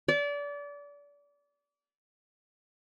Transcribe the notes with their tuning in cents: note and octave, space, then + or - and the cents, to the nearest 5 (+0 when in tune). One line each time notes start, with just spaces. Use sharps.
D5 -30